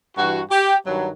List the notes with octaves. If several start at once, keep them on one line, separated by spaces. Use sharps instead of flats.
G2 E3 F#4
G4
G2 D#3 F#3